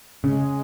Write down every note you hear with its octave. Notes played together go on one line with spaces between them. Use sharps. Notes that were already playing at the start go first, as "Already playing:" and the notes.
C#3 G#3